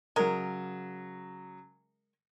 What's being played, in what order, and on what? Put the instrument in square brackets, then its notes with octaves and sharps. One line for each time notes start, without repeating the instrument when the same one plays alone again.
[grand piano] C#3 F#3 [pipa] G#3 A#4